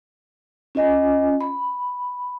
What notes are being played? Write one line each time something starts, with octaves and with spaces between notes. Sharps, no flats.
C#4 F4 D#5 G#5
B5